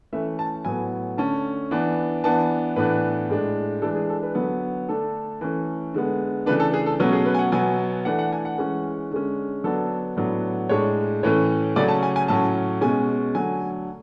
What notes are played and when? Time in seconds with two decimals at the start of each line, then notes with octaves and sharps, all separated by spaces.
0.13 E3 A3 C#4 E5
0.39 A5
0.65 A2 F#3 B3 G#5
1.17 D3 A3 C#4 A5
1.71 E3 B3 D4
2.24 E3 B3 D4 A5
2.76 A2 E3 B3 D4 B4
3.30 A2 G#3 D4
3.82 E3 G#3 D4 A4
3.95 G#4
4.10 A4
4.23 B4
4.35 D3 F#3 B3
4.89 D3 A3 D4 A4
5.41 E3 A3 C#4
5.94 D3 G#3 B3
6.46 C#3 E3 A3 D4 B4
6.60 A4
6.74 G#4
6.86 A4
7.00 B2 F#3 A3 C#4 B4
7.13 G#4
7.26 B4
7.35 G#5
7.39 F#5
7.52 B2 F#3 B3 G#5
8.05 E3 A3 D4 F#5
8.19 F#5
8.33 G#5
8.45 F#5
8.58 E3 G#3 C#4
9.11 D3 G#3 C#4
9.64 D3 F#3 B3 D4 A4
10.17 A2 F#3 B3 D4
10.69 A2 G#3 D4 C#5
11.23 A2 E3 A3 C#4 C#5
11.76 C#3 F#3 A3 C#4 D5
11.88 A5
12.03 G#5
12.16 G#5
12.28 A2 F#3 C#4 A5
12.81 B2 G#3 C#4 G#5
13.35 D3 F#3 A3 G#5